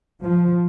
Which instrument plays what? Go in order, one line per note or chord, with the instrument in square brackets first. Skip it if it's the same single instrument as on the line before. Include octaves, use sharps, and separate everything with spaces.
[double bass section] F3